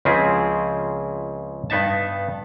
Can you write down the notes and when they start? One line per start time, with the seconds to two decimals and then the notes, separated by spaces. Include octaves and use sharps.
0.05 C#2 C#3 F3 C4 E4 G#4
1.70 G2 B3 D#4 E5 A5